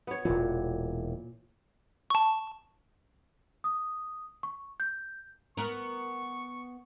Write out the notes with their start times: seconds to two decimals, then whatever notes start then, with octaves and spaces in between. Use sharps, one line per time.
0.07 B3 C#5
0.25 E1 A#2 E3
2.10 A5 C#6
3.64 D#6
4.43 C#6
4.80 G6
5.57 B3 A#4 C#6